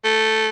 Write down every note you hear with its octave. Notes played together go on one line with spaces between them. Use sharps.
A3